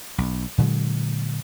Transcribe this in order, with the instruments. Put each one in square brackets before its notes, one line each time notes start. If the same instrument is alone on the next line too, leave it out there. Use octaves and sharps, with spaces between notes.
[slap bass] B1
A#2 D3 F#3 G#3